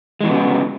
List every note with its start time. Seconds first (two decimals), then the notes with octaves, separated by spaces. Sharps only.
0.21 G#3
0.24 E3
0.27 B3
0.30 C#3
0.33 F#3